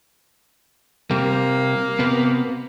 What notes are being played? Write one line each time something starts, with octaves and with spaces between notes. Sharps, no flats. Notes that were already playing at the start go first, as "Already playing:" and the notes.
C3 G3 A#3
C3 B3